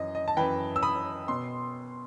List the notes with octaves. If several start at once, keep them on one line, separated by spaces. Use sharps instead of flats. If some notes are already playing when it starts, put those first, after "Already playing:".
Already playing: F#2 E3 D#5
D#5
A5
F#2 E3 G5 B5
E6
B5 D#6
B2 C6